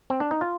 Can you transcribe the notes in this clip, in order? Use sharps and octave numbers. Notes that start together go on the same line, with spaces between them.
C4
D4
D#4
F4